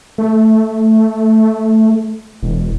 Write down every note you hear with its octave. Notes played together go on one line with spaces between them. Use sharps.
A3
E1